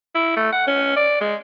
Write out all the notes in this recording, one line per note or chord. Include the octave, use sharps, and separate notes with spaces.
E4
A3
F#5
C#4
D5
G#3